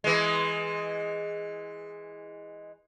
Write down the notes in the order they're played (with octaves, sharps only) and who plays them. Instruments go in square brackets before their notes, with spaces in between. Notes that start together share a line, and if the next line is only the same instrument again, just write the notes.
[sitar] E3 G#3